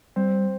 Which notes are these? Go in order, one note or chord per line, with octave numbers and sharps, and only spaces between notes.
G3 C4